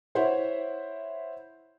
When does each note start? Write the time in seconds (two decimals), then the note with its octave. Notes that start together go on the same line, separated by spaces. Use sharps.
0.15 E4 C5 C#5 E5 F#5